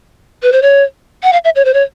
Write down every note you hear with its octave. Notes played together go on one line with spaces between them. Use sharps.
B4
C5
C#5
F#5
F5
E5
C#5
C5
C#5